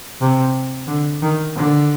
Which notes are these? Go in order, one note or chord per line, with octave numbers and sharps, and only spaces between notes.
C3
D3
D#3
D3